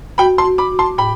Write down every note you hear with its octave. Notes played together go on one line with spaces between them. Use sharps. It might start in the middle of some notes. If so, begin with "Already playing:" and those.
F#4 G5 B5
A5 C6
F#4
B5 D6
F#4
A5 C6
A2 G5 B5